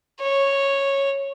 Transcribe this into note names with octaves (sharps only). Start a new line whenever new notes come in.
C#5